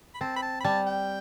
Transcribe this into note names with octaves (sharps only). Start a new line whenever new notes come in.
B5
C4 A5
B5
A5
B5
G3 A5
G5